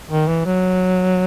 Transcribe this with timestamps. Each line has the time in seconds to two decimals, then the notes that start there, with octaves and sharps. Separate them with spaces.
0.10 D#3
0.28 E3
0.45 F#3